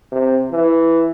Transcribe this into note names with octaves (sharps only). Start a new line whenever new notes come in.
C3
E3